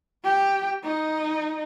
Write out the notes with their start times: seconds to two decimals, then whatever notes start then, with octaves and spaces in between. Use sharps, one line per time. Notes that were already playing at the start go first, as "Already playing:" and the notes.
0.24 G4 G5
0.83 D#4 D#5